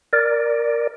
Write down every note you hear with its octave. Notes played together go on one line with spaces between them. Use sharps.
A#4 D5